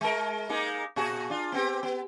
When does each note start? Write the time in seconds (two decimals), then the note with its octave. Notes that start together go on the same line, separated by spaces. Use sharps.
0.01 G#3 A#4
0.49 G#3 A#3 D#4
0.96 A#2 F#4 G#4
1.30 D4 F4
1.52 B3 C4 G4
1.83 B3